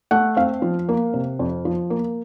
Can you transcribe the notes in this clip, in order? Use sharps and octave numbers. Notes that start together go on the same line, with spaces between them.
A3 F#5
C4 F5
F3
A#3
C3
F2
F3
A#3